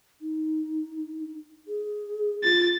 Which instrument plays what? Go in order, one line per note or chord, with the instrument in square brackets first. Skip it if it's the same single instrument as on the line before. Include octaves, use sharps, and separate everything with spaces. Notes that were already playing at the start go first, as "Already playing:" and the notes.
[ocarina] D#4
G#4
[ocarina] F4 [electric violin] A6